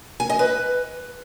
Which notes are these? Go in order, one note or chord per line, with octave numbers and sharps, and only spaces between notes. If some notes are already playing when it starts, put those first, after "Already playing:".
G#5
D#5
B4